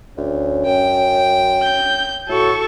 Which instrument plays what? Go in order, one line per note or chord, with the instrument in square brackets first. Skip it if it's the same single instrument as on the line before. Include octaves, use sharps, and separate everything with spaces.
[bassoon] D2 [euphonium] C#4
[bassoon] F#2 [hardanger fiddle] G5
[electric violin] G6
[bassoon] A2 [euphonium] F#4 [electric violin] A4 C#6